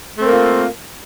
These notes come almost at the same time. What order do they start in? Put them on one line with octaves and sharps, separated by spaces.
A3 C4 A#4 A#3 F4